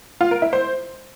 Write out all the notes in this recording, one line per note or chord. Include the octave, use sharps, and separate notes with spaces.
F4
A#4
E4
C5